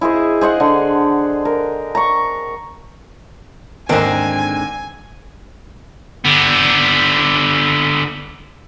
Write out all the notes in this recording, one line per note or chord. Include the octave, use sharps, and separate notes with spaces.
E4 G#4 C5 D#5
G#4 C5 D#5 F#5
D3
A#4
A#5 C#6
D#2 G#2 D3 C4 A#4 D#5 G#5
D3 B3